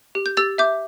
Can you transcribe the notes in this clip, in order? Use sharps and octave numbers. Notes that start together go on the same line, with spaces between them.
G4
G6
G4 E6 A6
E5 D6 G6